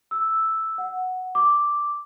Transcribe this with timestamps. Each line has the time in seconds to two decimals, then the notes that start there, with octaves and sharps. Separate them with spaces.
0.11 E6
0.78 F#5
1.35 D6